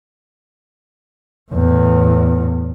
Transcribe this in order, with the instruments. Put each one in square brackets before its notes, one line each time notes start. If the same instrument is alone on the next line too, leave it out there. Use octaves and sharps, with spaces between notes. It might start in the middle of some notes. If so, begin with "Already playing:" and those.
[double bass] E2 A2